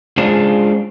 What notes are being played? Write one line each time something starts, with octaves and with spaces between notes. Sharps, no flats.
G#3 C#4 D4 F4 G#4 C5